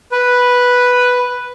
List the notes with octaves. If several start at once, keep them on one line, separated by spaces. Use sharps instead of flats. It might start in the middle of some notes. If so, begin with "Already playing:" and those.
B4